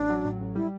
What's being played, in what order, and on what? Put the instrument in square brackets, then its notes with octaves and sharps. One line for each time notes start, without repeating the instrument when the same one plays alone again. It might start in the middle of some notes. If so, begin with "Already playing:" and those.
Already playing: [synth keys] A1 [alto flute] D4
[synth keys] F#3
A2
A1
[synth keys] G3 [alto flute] E4